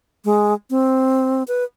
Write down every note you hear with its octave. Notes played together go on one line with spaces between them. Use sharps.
G#3
C4
B4